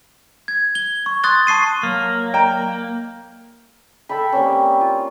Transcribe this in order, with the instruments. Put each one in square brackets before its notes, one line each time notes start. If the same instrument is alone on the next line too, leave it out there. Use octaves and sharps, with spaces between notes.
[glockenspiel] G#6
G7
C#6
C6 D#6 F#6 A6 G7
A5 C#6 C7 D#7
[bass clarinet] F#3 [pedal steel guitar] A#3
[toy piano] D5 D#5 A#5 [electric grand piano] G5
[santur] A4 E5 G5 B5
G3 A#3 C4 C#4
F4